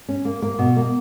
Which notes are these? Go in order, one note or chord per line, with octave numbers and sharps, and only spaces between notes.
C#4
A#3
A#3
B2
A#3